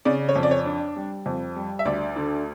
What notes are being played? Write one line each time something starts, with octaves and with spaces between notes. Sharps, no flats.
C#3 D5
C#5
F2
D5
C#5
D4
G3
F2
G3
E5
D2 D5
D3